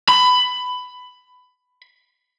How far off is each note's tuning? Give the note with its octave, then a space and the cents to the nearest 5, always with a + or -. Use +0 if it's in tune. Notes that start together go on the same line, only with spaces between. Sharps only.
B5 +15